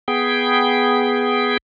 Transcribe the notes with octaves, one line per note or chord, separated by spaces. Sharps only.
B3 G#4 G5